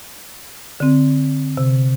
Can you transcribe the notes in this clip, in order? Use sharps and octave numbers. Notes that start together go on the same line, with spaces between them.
D3 C4
C3